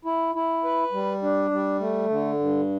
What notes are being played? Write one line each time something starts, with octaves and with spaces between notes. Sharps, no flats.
E4
E4
B4
G3
D4
G3
A3
D3
G2